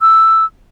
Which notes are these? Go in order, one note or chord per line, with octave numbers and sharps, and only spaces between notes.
E6